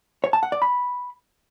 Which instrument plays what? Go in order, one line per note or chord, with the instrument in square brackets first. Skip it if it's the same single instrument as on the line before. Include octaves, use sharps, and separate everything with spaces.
[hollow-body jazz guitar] C#5
A5
F#5
D5
B5